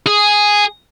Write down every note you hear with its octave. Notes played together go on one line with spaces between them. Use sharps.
G#4